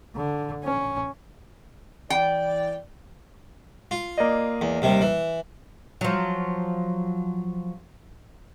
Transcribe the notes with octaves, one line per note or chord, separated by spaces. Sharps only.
D3
C#4
E3 D5 G5
F4
A#3 D5 D#5
E2
D#2 C3 G3
E3
F3 F#3